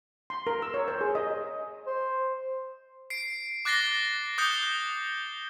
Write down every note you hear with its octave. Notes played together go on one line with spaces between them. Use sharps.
C6
A#4
E6
C#5
C5
G#4
D#5
C5
C7 D7
D6 F#6 A6 A#6 C7 G7
D6 D#6 F#6 G6 C#7 G7